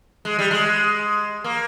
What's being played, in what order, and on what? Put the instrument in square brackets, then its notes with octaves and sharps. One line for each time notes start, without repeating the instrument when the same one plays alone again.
[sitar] G#3
G3
G#3
A#3